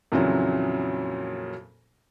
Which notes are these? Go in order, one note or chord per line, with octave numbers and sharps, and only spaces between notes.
F2 A#2 C#3 E3 F#3 A#3